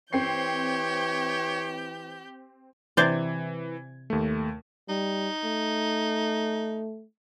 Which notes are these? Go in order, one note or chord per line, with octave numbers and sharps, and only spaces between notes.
E3 C4 G4 C#5 G6 C7
C3 E3 C5 D5 G#6
D#2 A3
G3 D#4
A3